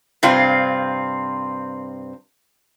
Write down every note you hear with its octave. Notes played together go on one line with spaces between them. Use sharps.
G2 C3 C4 F4